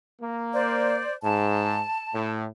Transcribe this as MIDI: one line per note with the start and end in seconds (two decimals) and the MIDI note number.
0.21 1.03 58
0.54 1.13 72
0.54 1.13 74
1.23 1.81 44
1.23 2.32 81
2.14 2.46 45